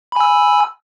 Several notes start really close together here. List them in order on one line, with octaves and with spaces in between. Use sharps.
B5 G#5 E6